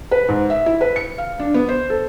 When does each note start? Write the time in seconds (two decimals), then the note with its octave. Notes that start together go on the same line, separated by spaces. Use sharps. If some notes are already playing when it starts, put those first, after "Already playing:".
0.11 B4
0.28 G#2
0.50 E5
0.66 E4
0.81 B4
0.96 C#7
1.18 F5
1.40 D4
1.54 B3
1.69 C5
1.90 A4